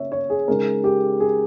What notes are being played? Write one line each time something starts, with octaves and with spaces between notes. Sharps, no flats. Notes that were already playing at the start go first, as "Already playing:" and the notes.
Already playing: C#3 A#3 C#5 E5
C#5
G#4
C#3 G#3 D#4 A#4
G4
G#4